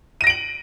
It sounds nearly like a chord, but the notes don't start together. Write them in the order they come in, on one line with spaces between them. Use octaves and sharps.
D#7 A#6 D7 F#7